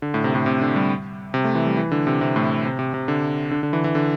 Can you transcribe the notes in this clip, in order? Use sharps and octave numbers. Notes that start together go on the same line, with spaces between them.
D3
A2
C3
A2
C3
D3
G3
C3
A3
E3
G3
E3
D3
C3
C3
A2
C3
C3
C3
D3
D3
D3
E3
E3
D3